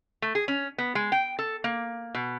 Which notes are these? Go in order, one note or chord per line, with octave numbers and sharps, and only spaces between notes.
A3
G#4
C#4
B3
G#3
G5
A4
A#3
B2